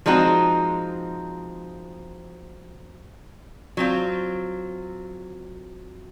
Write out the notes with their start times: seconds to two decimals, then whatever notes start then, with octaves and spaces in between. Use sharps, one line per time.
0.06 F3 G#3 C4 D#4 F#4
3.77 F#3 C4 F4